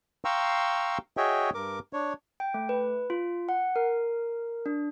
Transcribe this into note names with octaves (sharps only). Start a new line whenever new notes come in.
F5 G5 A#5 C6 C#6 E6
F#4 G#4 C#5 D#5 E5 G5
G2 A#4 D6
D4 C#5
G5
A3
B4
F4
F#5
A#4
D4